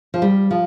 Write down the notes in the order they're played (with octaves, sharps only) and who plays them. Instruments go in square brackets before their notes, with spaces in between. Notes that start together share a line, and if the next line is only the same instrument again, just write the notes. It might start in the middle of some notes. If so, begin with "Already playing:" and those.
[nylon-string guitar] F3
G3
F3